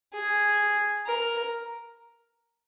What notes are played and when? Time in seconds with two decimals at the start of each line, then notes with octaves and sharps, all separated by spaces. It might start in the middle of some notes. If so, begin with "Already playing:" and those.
0.13 G#4
1.06 A#4